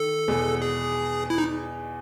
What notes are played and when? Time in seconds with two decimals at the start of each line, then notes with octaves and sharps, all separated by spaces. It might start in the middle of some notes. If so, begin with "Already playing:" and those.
Already playing: D#3 A4
0.28 E2 B2 G#3 B3
0.62 G#4
1.30 E4
1.38 D#4